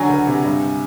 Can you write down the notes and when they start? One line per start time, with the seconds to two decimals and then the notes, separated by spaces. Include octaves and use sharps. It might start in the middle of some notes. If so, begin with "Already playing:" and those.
Already playing: D3 F#3 G#5
0.09 C#2
0.27 C3
0.44 G2